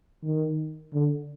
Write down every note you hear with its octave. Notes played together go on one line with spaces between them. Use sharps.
D#3
D3